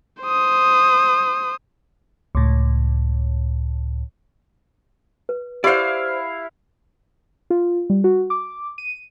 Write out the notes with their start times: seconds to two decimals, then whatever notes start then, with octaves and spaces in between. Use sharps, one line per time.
0.23 C5 D#6
2.35 C#2 A2
5.29 B4
5.64 E4 G4 C5 D5 F5
7.50 F4
7.90 G3
8.04 F#4
8.30 D6
8.78 D#7